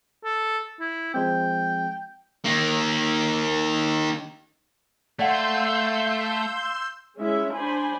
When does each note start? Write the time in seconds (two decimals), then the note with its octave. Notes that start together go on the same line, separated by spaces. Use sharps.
0.25 A4
0.80 E4
1.14 F3 G#3 C4 G5
2.45 D#3 A#3
5.19 A3 D5 F5 F#5 C6 E6 G6
7.18 G#3 C#4 E4 E5
7.54 D4 C5 G#5 B5